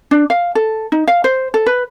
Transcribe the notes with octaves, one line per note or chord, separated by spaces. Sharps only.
D4
F5
A4
D#4
F5
C5
A4
B4